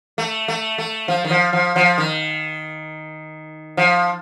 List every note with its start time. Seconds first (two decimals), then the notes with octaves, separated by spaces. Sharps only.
0.18 A3
0.48 A3
0.78 A3
1.08 F3
1.25 D#3
1.30 F3
1.53 F3
1.76 F3
1.98 D#3
3.77 F3